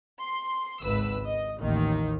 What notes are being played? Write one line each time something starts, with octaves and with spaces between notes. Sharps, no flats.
C6
G#1 C#2 B4 E6
D#5
A1 D#2 D#3